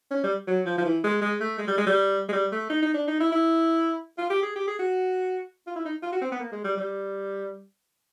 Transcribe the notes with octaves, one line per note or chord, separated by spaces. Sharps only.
C#4
G3
F#3
F3
F3
E3
G#3
G#3
A3
G#3
G3
G#3
G3
G#3
G3
A3
D#4
D#4
D4
D#4
E4
E4
F4
G4
G#4
G4
G#4
F#4
F4
E4
D#4
F4
F#4
C4
B3
A#3
G#3
G3
G3